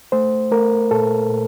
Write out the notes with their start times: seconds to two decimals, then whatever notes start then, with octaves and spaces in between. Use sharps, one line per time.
0.12 A3 C5
0.51 A3 A#4
0.91 A#2 A4
1.29 A#2